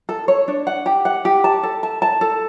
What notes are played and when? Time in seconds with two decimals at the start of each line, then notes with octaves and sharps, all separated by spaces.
0.09 A4
0.28 C#5
0.48 D4
0.67 F#5
0.86 G4
1.05 F#5
1.25 G4
1.44 A5
1.63 A4
1.83 A5
2.02 A5
2.21 A4